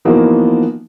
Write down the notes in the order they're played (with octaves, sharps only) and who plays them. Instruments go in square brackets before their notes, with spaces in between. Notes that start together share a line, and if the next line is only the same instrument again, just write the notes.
[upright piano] E3 F3 A#3 B3 D#4 F#4